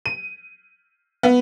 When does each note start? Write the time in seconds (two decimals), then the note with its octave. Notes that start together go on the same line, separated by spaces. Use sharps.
0.06 D#7
1.23 B3